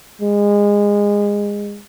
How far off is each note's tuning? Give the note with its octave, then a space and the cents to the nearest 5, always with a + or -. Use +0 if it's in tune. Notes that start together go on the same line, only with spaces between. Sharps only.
G#3 -25